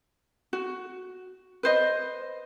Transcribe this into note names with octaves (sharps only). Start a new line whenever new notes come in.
F#4
B4 C5 D#5